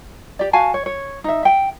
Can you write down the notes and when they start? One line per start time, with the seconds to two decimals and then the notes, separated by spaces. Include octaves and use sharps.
0.39 G4 D5
0.53 F#4 F5 G#5 A5
0.74 C#5
0.86 C#5
1.24 D#4 E5
1.43 E5 G5